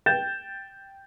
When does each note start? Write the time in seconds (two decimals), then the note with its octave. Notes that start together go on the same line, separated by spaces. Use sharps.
0.06 G5 G6 A6 E7